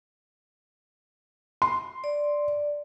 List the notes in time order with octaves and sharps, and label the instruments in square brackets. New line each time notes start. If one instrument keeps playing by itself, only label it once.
[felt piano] C6
[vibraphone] D5